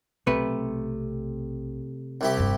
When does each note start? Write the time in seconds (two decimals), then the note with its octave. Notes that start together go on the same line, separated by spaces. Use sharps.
0.27 B1 C3 A3 B4
2.21 C2 E4 G4
2.37 F1 G2